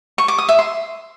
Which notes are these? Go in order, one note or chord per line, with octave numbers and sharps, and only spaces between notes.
C#6
D6
D#6
E5
C6